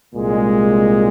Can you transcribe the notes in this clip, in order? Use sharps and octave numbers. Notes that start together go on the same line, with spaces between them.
C2 A#2 G#3